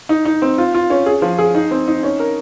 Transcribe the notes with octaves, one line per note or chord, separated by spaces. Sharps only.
D#4
D#4
C4
F4
F4
C#4
G#4
F3
G#4
D#4
C4
D#4
C#4
A#4